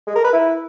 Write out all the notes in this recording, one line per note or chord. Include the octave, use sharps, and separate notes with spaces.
G#3
A#4
B4
E4